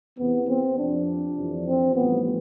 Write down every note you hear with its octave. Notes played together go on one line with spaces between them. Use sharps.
E2 C3 E3 B3
C4
F2 C3 F3 D4
F2 C3 E3
C4
A1 G2 F3 B3